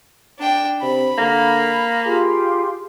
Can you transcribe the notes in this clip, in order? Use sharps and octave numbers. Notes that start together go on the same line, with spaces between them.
D4 G5
C3 B5
D3 A#3
F4 G4 G#4 C6